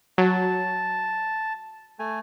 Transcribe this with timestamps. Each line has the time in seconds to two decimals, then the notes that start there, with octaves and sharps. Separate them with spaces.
0.18 F#3 A5
1.99 A3 G#5